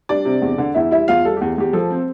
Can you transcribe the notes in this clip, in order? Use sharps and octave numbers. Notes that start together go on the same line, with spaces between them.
G3 D4 D5
C3
E2
D3
E2 E4 E5
G3 E4 E5
E2 F4 F5
G3 A4
E2 G4
E2 G4
F3 A4
C4